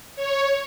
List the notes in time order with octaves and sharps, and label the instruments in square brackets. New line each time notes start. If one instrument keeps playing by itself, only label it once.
[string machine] C#5